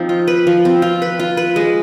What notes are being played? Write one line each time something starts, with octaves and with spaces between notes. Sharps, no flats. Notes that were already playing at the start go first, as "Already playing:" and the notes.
Already playing: F3 C4 D#4
F4
B4
F3
C4
F4
B4
F4
B4
G#3